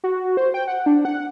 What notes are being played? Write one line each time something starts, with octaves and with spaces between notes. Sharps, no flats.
F#4
C5
G5
F#5
D4
F#5